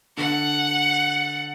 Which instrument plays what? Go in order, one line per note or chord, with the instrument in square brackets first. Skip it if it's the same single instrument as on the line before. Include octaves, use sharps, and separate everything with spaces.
[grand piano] D3 [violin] F#5